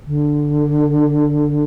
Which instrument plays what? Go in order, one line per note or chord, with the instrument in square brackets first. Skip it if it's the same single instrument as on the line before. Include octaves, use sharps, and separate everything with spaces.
[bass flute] D3